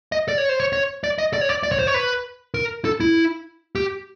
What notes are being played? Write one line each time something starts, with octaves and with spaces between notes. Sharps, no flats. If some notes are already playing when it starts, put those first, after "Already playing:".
D#5
D5
C#5
C5
C#5
C#5
D5
D#5
D5
C#5
D5
D5
C#5
C5
C#5
B4
A#4
A4
E4
G4